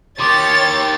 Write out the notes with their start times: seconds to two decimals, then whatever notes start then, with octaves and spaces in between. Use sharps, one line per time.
0.20 D#3 G4 C#5 C6 D6 A6